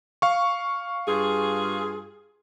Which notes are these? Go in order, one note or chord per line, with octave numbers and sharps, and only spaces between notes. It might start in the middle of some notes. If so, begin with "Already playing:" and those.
F5 C#6
G2 F4 G#4